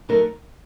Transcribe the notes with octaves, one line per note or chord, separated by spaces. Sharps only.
F#3 A3 D#4 A#4